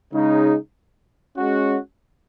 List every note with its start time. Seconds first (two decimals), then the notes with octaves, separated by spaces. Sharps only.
0.13 C#3 G#3 D#4
1.36 G#3 C#4 F#4